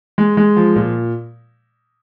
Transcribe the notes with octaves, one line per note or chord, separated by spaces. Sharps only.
G#3
G#3
F3
A#2